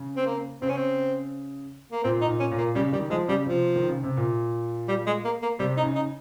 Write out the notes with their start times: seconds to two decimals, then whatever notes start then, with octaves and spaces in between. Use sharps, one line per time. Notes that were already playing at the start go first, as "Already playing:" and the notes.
Already playing: C#3
0.17 C4
0.26 A#3
0.62 C#3 C4
0.69 C#4
0.76 C4
1.92 A#3
2.04 A#2 C4
2.21 D#4
2.28 A#2
2.40 C#4
2.51 A#2
2.58 A#3
2.75 C#3 G3
2.92 D#3 G3
3.10 F3 G#3
3.28 C#3 G3
3.46 C3 F3
3.76 D#3
3.89 C#3
4.03 C3
4.17 A#2
4.88 G3
5.06 G#3
5.24 A#3
5.42 A#3
5.59 C3 G3
5.77 D#4
5.83 C#3
5.95 D#4